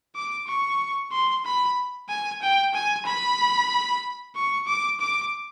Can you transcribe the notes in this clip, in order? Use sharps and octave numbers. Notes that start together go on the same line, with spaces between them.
D6
C#6
C6
B5
G#5
G5
G#5
B5
C#6
D6
D6